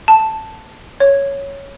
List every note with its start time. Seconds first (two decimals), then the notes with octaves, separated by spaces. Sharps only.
0.08 A5
1.00 C#5